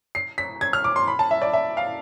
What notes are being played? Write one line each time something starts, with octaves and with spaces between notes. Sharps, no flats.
C7
B6
G#6
F6
D6
C6
B5
A5
E5
D5
E5
F5